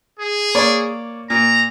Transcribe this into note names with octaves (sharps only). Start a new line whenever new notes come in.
G#4
A#3 C#5 D5
A#2 A#5